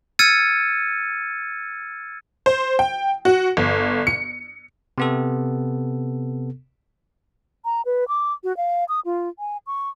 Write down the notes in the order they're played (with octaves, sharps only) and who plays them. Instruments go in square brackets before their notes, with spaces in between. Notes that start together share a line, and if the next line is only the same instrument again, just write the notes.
[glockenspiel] E6 F6 G#6 A6 C#7 D#7
[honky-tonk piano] C5
G5
F#4
G1
C#7
[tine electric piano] C3 B3 A4
[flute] A#5
B4
D6
F#4
F5
D#6
F4
G#5
C#6